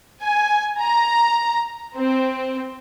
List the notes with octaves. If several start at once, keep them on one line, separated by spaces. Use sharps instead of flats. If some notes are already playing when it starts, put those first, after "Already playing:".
G#5
A#5
C4